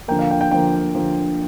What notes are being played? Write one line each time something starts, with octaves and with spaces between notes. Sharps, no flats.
D3 F3 A#3 G5
F5
G5
G5
D3 F3 A#3 G5
D3 F3 A#3